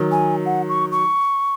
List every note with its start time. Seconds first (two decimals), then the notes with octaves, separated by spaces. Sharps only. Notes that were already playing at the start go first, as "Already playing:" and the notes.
Already playing: D#3 F#3
0.11 G#5
0.46 F#5
0.69 C#6
0.92 C#6